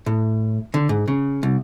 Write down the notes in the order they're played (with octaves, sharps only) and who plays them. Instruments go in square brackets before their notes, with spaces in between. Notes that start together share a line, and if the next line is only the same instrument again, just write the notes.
[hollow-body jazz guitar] A2
D3
G#2
C#3
C2